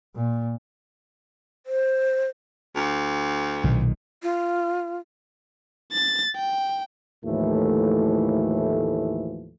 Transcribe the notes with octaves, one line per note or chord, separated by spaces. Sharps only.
A#2
C5
D2
B1 A#2 D#3
F4
A6
G5
D#2 A2 E3 F3 A3